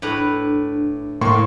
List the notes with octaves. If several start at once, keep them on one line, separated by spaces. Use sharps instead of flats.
A2 D4 B4 A#5
A2 A#3 C6 C#6